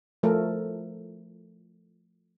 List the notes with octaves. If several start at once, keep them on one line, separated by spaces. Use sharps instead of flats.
F3 A3 A4 A#4